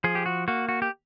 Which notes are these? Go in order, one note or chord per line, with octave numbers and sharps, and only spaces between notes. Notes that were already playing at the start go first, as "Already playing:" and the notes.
F3 G#4
G4
F#4
A#3 F#4
F#4
G4